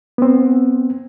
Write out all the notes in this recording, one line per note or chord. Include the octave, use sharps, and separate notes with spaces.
B3 C4